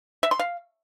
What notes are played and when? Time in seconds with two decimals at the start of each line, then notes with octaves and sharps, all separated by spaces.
0.23 E5
0.31 C6
0.39 F5